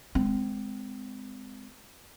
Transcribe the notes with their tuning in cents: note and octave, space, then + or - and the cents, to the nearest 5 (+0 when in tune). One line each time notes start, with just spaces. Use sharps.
G#3 +0 C4 -25